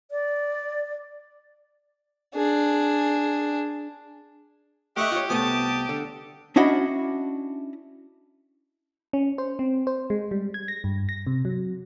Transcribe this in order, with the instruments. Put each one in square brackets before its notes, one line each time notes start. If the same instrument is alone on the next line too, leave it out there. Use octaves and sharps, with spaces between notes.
[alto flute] D5
[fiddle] D4 G#4
[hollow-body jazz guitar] A3 E5 [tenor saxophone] G4 [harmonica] D#5 F#5 C#6
[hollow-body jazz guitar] F4 C#5
[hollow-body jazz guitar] C2 A3 B3 [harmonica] A5 D#6
[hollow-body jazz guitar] D3
C#4 D4 E4 F#4 D#5 B5
[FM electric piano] C#4
C5
C4
C5
G#3
G3
G#6
A#6
G2
A#6
C3
F#3